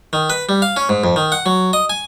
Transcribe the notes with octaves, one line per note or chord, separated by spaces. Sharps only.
D#3
B4
G3
F5
C#4
G#2
F2
D#3
F#5
F#3
D#5
G#5